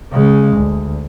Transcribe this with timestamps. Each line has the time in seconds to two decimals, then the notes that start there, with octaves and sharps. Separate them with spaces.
0.13 C#3 G#3
0.57 D2